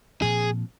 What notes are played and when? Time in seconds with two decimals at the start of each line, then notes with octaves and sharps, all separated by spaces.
0.22 A#2 F3 C4 G#4